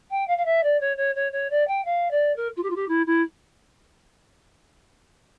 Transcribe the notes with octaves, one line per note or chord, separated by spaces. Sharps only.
G5
F5
F5
E5
D5
C#5
C#5
C#5
C#5
D5
G5
F5
D5
A#4
F4
G4
F4
G4
E4
E4